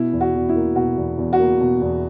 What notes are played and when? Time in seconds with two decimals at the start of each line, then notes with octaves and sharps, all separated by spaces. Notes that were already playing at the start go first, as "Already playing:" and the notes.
Already playing: B2 E4
0.13 E2
0.21 F#4
0.35 E2
0.49 E4
0.56 A#3
0.76 B2 F#4
0.97 E2
1.18 E2
1.33 F#4
1.39 A#3
1.60 B2
1.82 E2